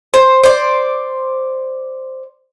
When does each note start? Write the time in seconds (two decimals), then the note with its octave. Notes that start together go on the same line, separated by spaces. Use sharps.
0.14 C5
0.43 C5 D5